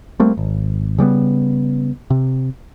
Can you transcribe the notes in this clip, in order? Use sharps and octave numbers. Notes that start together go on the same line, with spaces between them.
G3 A3 A#3 C4
G#1
C#3 G3 A#3 B3
C3